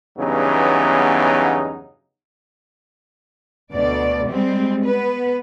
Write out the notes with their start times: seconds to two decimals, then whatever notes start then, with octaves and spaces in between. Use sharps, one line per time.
0.18 E2 G2 C#3 F#3 B3 D#4
3.72 D2 B2 D5
4.27 G3 G#3 C4
4.85 B3 B4